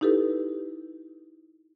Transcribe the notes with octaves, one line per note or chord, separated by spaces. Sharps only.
D#4 E4 G4 A4 B4